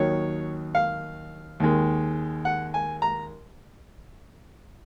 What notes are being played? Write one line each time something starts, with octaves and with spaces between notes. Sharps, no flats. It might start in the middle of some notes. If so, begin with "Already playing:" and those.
Already playing: D#2 D#3 F#3 C#5
F5
D#2 D#3 G#3
F#5
G#5
A#5